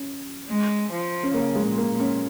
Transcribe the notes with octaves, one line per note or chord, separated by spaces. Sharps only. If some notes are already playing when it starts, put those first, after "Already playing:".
Already playing: C#4
G#3
F3
C#4
C#3 A#3
G#3
A#2
A#3
A#2
C#4